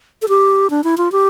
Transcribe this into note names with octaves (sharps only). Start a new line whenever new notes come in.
A4
G4
D4
E4
F4
G4